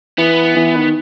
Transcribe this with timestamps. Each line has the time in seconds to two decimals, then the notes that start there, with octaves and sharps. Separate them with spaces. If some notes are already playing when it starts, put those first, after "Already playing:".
0.18 E3 B3
0.57 E3
0.76 D#3